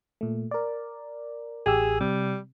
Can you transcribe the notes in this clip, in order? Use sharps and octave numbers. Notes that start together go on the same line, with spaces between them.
A#2 A3
A#4 D5
A1 G4 G#4 E6
C3 G3